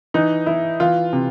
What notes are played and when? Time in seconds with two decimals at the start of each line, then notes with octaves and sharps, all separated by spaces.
0.14 E3 D#4
0.46 E3 E4
0.80 E3 F4
1.13 C3